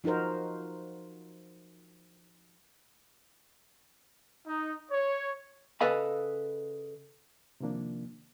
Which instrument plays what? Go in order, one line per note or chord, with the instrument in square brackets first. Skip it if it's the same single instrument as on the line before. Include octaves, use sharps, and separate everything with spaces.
[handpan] F3 D#4 F#4 A#4 C5
[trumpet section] D#4
C#5
[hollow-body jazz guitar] C#3 A4 B4 D#5 F5 B5
[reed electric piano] C3 D#3 F3 A#3 D4